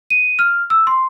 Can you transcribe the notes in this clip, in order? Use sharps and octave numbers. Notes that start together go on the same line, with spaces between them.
D#7
F6
E6
C6